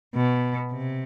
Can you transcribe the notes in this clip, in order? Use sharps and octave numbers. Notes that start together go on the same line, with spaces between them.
B2
C3